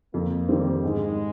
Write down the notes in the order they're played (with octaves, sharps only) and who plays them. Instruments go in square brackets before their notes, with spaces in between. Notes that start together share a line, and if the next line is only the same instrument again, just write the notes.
[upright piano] F2 [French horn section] A#3
[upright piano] D#3 G3 C4
[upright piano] G#2 [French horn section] G#3